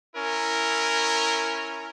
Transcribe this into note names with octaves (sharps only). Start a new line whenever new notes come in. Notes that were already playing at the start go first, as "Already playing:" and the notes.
C#4 E4 A#4